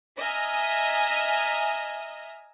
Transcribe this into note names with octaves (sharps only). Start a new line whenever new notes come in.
D#5 E5 G#5 A#5 D#6 F6